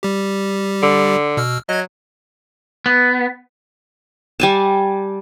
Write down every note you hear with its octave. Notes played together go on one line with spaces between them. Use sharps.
G3 G4
D3
B2 E6 F6
F#3 D#5 G#6
B3
G3 G#5 A5